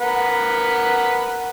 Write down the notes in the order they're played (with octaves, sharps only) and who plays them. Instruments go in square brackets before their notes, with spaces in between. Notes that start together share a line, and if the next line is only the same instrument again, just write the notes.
[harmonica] A#4 B4 F#5